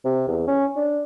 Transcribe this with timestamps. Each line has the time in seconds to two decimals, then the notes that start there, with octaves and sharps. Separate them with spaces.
0.05 C3
0.28 E2
0.47 C#4
0.76 D4